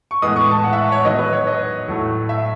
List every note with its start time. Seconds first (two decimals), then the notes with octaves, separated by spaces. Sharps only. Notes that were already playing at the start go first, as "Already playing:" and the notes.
0.11 C#6
0.22 A2 E3 G#3 B3 D#6
0.36 C#6
0.51 A5
0.64 F#5
0.73 E5
0.77 F#5
0.92 C#5
1.05 D#3 F#3 B3 D#4 D#5
1.19 B4
1.33 C#5
1.47 D#5
1.88 A2 F#3 A3
2.29 E5